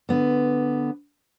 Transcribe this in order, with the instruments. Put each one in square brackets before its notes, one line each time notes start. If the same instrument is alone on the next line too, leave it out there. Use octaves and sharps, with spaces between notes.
[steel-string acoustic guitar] D3 B3